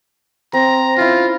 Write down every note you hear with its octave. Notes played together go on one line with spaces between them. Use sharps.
C4 A#5
C#4 E4 F4